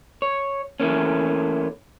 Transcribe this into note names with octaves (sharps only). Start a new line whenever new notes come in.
C#5
E3 A3 A#3 C#4